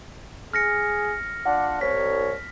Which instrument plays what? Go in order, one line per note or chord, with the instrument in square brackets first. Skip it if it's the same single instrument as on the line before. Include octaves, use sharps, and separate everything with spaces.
[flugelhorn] G#4 [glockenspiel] F6 A#6 C#7
[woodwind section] D4 F4 F#5 [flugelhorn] D5
[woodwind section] C2 [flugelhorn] C#5 [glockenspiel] B6